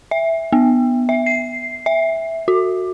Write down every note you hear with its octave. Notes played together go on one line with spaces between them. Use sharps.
E5
B3
E5
C7
E5
F#4